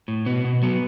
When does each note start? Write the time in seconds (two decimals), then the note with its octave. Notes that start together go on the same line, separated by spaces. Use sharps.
0.08 A2
0.26 B2 B3
0.44 B2
0.63 F#3 B3